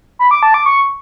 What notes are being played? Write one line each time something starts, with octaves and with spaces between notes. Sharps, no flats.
B5
D6
A5
D6
C#6